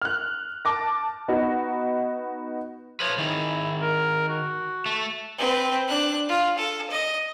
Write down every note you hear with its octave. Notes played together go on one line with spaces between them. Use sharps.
F6 F#6
A5 D6 A#6
B3 D#4 F#4
F3 B4 C#5
D#3 E4 G#4
A#4
F#4
A3
C4 B4
D4 F#6
F4
A4
D#5